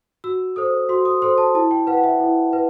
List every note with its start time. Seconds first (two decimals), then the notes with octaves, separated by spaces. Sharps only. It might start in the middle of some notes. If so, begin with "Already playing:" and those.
0.24 F#4 E6
0.56 A4 C5 D#6
0.89 F#4 C6
1.05 D#6
1.22 A4 C5 C6
1.38 A5
1.55 E4 A5
1.71 G5
1.87 B4 F#5
1.97 F#5
2.04 E5
2.20 E4
2.53 B4